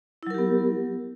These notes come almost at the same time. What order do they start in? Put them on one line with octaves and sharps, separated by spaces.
E4 F#3 A#4 G4 B3